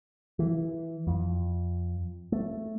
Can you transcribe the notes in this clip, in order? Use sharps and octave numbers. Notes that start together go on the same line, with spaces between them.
E3
F2
A3